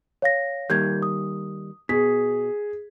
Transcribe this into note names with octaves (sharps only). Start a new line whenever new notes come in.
C#5 F5 A#6
D#3 G3 A#3 G6 G#6
D#6
B2 G#4 B6